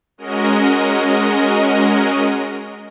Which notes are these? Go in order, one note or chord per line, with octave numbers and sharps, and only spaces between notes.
G#3 C#4 F#4 A#4 D#5